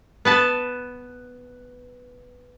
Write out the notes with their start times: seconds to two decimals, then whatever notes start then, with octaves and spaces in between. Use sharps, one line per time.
0.25 B3 B4 A5